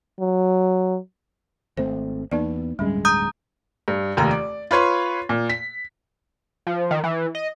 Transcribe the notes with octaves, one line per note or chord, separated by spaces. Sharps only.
F#3
G#1 A3 C4 C5
E2 A#3 B3 D#4 D5
D1 G2 G3 G#3 C#4
A#5 D#6 G6
G2
F1 D#2 A#5
D5
F4 B4 C#5 C6
A#2
B6
F3
D#3
E3
D#5